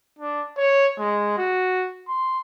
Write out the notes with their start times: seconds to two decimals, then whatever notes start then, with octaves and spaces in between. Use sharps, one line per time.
0.19 D4
0.57 C#5
0.99 G#3
1.38 F#4
2.08 C6